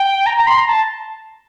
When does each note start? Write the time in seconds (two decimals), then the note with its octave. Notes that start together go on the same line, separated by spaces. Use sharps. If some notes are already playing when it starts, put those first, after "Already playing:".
Already playing: G5
0.26 A#5
0.37 A#5
0.47 C6
0.58 A#5
0.67 A5